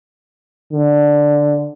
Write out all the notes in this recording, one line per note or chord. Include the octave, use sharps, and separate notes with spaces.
D3